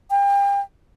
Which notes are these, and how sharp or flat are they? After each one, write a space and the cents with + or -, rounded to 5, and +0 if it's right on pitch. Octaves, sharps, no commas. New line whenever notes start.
G5 +35